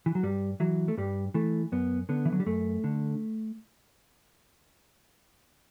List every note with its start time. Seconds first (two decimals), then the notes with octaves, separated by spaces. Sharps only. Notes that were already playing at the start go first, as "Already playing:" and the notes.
0.06 E3
0.15 F#3
0.23 G2 G3
0.60 E3 F#3
0.88 A3
0.97 G2 G3
1.34 E3 A3
1.72 F#2 B3
2.09 D3 B3
2.25 E3
2.33 F#3
2.40 G3
2.46 F#2 A3
2.84 D3